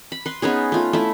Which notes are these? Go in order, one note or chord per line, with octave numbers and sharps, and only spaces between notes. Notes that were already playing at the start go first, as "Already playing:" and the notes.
B5
B4 C6
B3 C#4 D#4 G#4
A3 F4
A3 E4